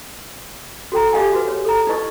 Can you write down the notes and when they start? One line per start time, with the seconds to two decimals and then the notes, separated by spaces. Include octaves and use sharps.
0.92 F#4 A4 G5 A#5
1.13 G4 G#4 D#5 F5 F#5 G#5
1.33 F#4 B4
1.48 C#5
1.64 A4 A#5
1.87 D#4 E4 B4 D#5 C#6